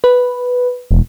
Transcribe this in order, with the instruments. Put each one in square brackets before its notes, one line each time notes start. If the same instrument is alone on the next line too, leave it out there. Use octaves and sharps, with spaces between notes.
[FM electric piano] B4
[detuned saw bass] E1